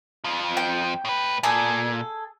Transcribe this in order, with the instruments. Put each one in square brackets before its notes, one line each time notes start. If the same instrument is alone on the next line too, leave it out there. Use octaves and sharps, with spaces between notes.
[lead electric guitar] F2 F3
[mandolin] G5
[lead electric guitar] A2 B4
[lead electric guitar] A#2 [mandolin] G#4 A4 G#5